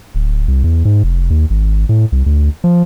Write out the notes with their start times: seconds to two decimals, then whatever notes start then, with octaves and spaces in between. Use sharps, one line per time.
0.15 D1
0.48 C2
0.64 E2
0.85 G#2
1.04 F1
1.30 D#2
1.50 G#1
1.89 A2
2.12 C2
2.26 D2
2.64 F3